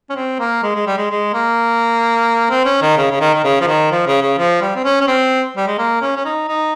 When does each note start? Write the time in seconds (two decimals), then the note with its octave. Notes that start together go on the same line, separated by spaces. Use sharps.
0.10 C#4
0.16 C4
0.40 A#3
0.63 G#3
0.75 G#3
0.87 G3
0.98 G#3
1.11 G#3
1.34 A#3
2.51 C4
2.66 C#4
2.82 D#3
2.98 C#3
3.11 C#3
3.21 D#3
3.35 D#3
3.44 C#3
3.61 F3
3.67 D#3
3.91 F3
4.07 C#3
4.22 C#3
4.38 F3
4.62 G3
4.76 C4
4.85 C#4
5.01 C#4
5.08 C4
5.57 G3
5.67 G#3
5.78 A#3
6.02 C#4
6.16 C#4
6.25 D#4
6.49 D#4